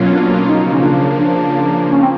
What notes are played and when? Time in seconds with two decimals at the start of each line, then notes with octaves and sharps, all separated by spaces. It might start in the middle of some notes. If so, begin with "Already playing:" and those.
Already playing: B2 F#3 A#3 C#4 F4
0.11 D4
0.47 C#3 F3 A#3 D#4
0.73 C#4
0.84 D4
1.20 D4
1.92 C#4
2.02 C4